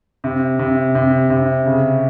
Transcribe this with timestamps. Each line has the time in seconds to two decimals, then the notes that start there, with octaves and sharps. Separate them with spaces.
0.24 C3
0.59 C3
0.95 C3
1.30 C3
1.66 C#3